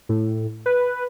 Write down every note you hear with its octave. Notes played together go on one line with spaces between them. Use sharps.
A2
B4